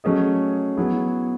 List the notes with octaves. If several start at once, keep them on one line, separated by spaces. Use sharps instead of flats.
F#3 A3 C#4 G#4 D#5
F#3 B3 E4 G#4